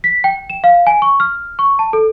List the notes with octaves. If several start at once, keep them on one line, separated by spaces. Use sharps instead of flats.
B6
G5
E7
F5
G#5
C#6
F6
C#6
A5
A4